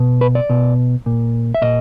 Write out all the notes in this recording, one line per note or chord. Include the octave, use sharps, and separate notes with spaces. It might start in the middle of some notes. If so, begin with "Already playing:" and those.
Already playing: B2
B4
D5
B2
A#2
E5
A#2 D#5